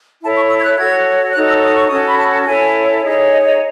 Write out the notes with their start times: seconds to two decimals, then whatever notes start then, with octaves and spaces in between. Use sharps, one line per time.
0.23 E4 A4 C#5 A5
0.36 C#6
0.50 E6
0.59 G#6
0.64 F#6
0.78 F#4 A4 C#5 G#6
1.34 D#4 F#4 A4 C#5 F#6
1.49 E6
1.63 D#6
1.75 C#6
1.88 C#4 F#4 A4 D#6
2.08 B5
2.19 A5
2.34 A5
2.47 E4 A4 C#5 G#5
3.04 D#4 G#4 C#5
3.32 D#5
3.46 D#5